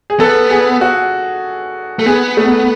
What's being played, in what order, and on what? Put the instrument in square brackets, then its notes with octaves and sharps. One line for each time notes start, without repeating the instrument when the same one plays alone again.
[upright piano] G#4
[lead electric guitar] B3 [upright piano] A4
[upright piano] G#4
F#4
[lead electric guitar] A3
[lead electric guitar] B3 [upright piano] G#4
[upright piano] A3